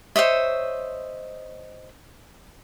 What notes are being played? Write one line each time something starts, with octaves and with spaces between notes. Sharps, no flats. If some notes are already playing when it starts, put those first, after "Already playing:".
C5 C#5 D#5 E5